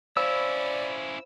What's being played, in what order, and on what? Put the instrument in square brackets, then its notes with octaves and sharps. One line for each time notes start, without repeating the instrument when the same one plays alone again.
[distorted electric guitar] C#4 E4 [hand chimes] C5 F5 B5 [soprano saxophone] D5 [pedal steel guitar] E6